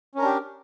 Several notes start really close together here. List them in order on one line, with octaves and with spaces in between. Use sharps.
C#4 A#4 D4 G4